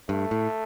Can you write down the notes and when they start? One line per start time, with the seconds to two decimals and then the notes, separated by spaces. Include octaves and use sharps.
0.09 G2 A3
0.31 A2